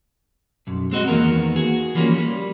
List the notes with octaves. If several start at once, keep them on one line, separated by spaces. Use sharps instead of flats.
B1 F#2
G#3 C4 F#4 D#5
E2 D#3 A#3 B3 A#4
F#4 G#4
E3 F3 G3 A#3 C#4
G3